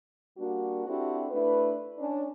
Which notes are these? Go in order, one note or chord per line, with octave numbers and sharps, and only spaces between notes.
G3 A#3 D4 F#4
C4 D4 E4 F#4 G4 A4
A3 D4 E4 B4
C#4 D4